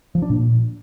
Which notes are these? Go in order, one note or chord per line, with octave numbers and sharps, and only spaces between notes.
F3
D4
A#2